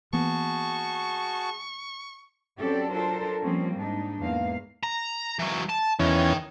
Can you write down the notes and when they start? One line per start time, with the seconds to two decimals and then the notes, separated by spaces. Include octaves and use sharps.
0.13 E3 A#3 B3 F#4 G#4 A5 C#6
2.59 F#3 C4 C#4 G4 A4 D5
2.92 D4 F4 A4 A#4 C5
3.43 F3 G3 A#3 C4 C#4
3.76 G#2 D4 D#4
4.19 E2 G#2 A#3 F5
4.83 A#5
5.39 E3 F#3
5.69 A5
5.99 E2 D#3 C#4